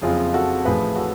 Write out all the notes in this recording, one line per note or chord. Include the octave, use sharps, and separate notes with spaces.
F#1 F2 C#3 F3 F4 G#4
F#4 A4
A1 A2 F3 G#4 B4
F#4 A4